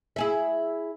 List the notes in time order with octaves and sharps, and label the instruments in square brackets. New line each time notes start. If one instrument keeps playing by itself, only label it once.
[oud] E4 G#4 E5